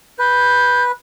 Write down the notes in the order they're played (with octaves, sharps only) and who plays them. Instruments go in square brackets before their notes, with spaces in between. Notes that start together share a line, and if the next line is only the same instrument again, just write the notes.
[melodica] B4 [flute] G6